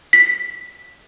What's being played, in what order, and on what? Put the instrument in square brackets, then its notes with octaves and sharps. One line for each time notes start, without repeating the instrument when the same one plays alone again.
[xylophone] B6